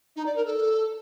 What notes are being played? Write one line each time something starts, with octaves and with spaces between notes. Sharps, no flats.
D#4
D5
A#4
A4